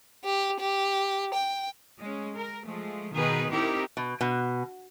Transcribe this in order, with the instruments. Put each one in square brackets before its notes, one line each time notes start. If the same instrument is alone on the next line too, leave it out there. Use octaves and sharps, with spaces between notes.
[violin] G4
G4
G5
[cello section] G#3 C#4
A#4
F3 G#3 A3
B2 D#3 D#4 G#4 B4
C4 D#4 E4 G4 A#4
[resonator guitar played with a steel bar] B2
B2